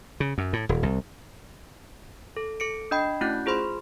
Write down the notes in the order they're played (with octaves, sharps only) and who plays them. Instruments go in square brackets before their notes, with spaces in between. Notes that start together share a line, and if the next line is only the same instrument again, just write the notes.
[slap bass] C#3
F#2
A2
D#1
C2
[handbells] A4
A4 C#7 D7
D4 D#5 G5 B5
A3 C#4 E4 F#4 F#6 G6
F4 G#4 C5 B5 C6